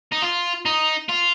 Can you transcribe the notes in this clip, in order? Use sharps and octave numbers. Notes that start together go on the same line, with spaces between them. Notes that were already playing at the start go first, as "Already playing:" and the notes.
D#4
F4
D#4
F4